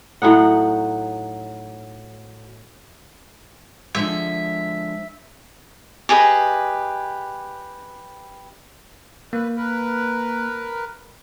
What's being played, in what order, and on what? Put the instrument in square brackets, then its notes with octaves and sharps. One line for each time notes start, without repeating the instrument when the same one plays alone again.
[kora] A2 F#3 D#4 F#5
[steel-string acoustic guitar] D3 F3 G#3 [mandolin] E5
[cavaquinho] G4 G#4 B4 D#5
[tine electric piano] A#3 [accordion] B4
[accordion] A#4 B4